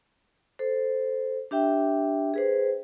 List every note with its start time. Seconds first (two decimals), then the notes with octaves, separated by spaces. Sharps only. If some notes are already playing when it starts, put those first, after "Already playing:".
0.59 A4 C5
1.51 D4 G4 E5 G5
2.34 G#4 B4 C5